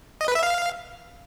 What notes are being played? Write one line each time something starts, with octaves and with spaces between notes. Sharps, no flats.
D#5
B4
E5
F5